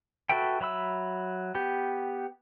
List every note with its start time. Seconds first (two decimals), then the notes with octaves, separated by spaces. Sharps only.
0.29 F#4 A4 B4 E5 G5
0.61 F#3 E5 B5 E6
1.55 B3 G4